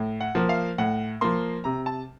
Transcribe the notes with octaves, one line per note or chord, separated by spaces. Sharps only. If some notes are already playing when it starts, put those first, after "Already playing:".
Already playing: A2
F#5
F3 A#3
F5
A2 F#5
F3 A#3 C6
C3 A#5
A5